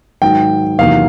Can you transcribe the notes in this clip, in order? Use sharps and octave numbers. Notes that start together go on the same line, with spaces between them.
G#2 D#3 F#3 G5
E2 C3 D#3 F#3 A#3 F5